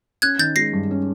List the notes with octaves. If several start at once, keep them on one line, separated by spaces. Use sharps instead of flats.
C#4 F#6 G#6
D#3 G6 A6
G#3 A#6 C7
G2
C#4